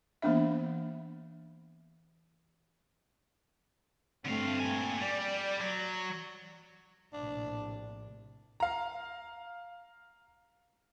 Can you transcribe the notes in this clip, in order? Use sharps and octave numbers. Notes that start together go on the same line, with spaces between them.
E3 A#3 B3 D4 E5
G2 D3 A3 C4 F5
A#2 G#5
G3 D5
F#3
A#1 A2 C3 D4
F5 A#5